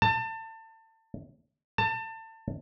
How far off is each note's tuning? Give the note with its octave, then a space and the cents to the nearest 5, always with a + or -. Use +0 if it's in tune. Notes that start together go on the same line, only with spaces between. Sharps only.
A5 +30
A5 +30